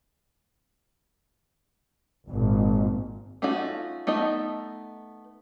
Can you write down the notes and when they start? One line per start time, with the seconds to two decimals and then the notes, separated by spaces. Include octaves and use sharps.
2.29 G#1 A#2
3.42 A3 C#4 D#4 F4 F#4
4.07 A3 B3 D#4 D#5